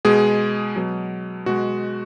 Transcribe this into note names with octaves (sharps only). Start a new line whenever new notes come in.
B2 G#3 G#4
B2 F#3
B2 G#3 F#4